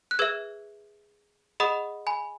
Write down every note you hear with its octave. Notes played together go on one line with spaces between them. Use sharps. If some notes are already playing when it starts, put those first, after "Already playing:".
F#6
G#4 B4 E5 E6 G#6
G#4 D#5 F#5 B5 D#6
G#5 B5